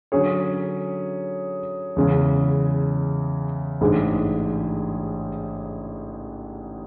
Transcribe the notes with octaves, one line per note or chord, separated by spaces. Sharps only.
D3 F#3 C#4 G#4 C#5
E2 C#3 G#3 C#4
A1 G#2 G#3 D4 G#4